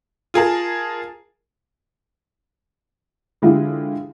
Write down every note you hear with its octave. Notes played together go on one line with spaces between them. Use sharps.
F4 G#4 A#4 A5
D3 E3 G#3 E4 F4 G4